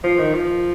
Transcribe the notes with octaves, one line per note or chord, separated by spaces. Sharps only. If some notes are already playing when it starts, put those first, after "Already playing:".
F3
D#3
F3